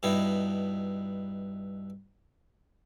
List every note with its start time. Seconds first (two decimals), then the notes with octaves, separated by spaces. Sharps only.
0.03 G2 B2 D#4 E4